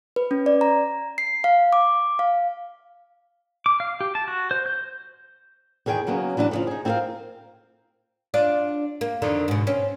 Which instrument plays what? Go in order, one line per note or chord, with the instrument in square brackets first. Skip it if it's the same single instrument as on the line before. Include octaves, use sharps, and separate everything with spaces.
[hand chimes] B4
C#4
D5
A#5
C7
F5
D6
F5
[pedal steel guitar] D6
F5
G4
A5
F#4
C5
G6
[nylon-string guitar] E2 D#3 G#4 A4 G5
C#3 F#3 A#3 B3 C#4
E3 F#3 D4 D#5 A5
A2 C#3 F3
D#4 G#4
C4 E4 F4 G#4 A#4 F5
[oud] D4 F4 D5
A#3
F2 D3 D#3
G#2 B2
C4 C#4